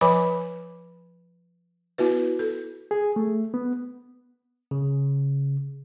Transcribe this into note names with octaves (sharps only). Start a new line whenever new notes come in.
F3 B4 C#5 G#5 B5 D6
B3 E4 F#4 B4
A4
G#4
A3
B3
C#3